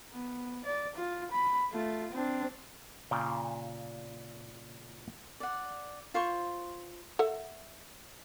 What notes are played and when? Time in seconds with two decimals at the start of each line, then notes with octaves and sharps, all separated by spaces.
0.12 B3
0.64 D5
0.95 F4
1.32 B5
1.71 A3 F4
2.11 C4 D4
3.11 A#2 C#3 G5
5.40 D5 F#5
6.14 F4 C5 C6 C#6
7.19 A4 E5 F#5